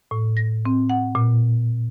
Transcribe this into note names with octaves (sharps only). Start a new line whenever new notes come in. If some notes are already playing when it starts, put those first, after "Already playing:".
A2
A#6
C4
F#5
A#2